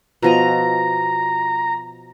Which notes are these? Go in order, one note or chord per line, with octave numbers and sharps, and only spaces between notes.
B2 F3 D#5 A#5